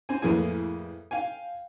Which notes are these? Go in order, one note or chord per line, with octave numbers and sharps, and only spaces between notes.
C4 G#5
F2 A2 E3 A#3 G#4 G#5
F5 G5 G#5